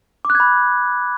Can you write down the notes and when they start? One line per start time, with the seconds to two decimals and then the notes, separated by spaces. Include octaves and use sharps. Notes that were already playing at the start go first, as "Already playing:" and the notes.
0.25 D6
0.30 F#6
0.35 G#6
0.40 B5